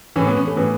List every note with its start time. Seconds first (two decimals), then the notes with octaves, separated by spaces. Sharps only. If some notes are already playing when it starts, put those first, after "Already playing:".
0.16 A2 E3 C#4
0.27 B3
0.37 C#4
0.47 A3
0.57 A2 E3 B3